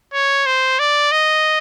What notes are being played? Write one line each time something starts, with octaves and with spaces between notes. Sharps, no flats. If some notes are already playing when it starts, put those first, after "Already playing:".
C#5
C5
D5
D#5